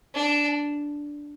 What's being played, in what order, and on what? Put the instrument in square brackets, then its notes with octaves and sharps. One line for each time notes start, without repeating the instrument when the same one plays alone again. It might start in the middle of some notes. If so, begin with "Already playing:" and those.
[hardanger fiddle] D4